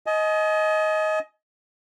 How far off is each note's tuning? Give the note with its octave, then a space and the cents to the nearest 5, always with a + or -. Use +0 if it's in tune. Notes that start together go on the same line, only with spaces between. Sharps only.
D#5 +15 G#5 +40